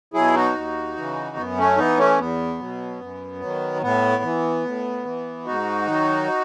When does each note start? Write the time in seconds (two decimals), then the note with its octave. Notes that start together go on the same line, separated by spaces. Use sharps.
0.14 B2 F#3 E4 G#4
0.35 D#4 F#4
0.54 D#2
0.96 C#3 E3
1.37 F#2 B3
1.58 A3 C#4
1.77 E3 B3 D#4
1.97 A3 C#4
2.19 E2 B3
2.59 B2 F#3
3.01 F#2
3.41 D#3 F#3
3.82 A2 B3
4.23 E3
4.64 A2
5.05 E3
5.45 G#2 D#4 F#4
5.87 D#3 F#3